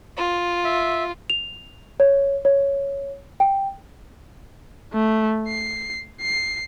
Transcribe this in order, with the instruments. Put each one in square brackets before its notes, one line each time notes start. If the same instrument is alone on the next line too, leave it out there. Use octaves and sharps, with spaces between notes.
[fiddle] F4
[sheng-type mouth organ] E5
[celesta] F7
C#5
C#5
G5
[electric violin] A3
C7
C7